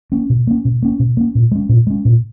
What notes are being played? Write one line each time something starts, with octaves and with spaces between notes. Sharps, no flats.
A#3 C#4
B2
A#3 C#4
B2
A#3 C#4
B2
A#3 C#4
A#2
G#3 C#4
A#2
G#3 C#4
A#2